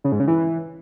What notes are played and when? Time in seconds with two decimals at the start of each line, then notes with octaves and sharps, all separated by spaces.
0.04 C#3
0.12 G#2
0.20 C#3
0.28 E3